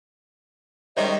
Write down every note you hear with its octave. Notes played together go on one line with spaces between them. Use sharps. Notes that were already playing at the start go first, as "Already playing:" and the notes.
D#3 G3 G#3 C#4 C5 C#5 D#5 E5